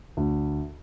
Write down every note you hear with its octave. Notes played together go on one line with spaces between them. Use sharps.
D2